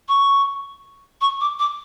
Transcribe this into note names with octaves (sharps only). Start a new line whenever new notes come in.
C#6
C#6
D6
D6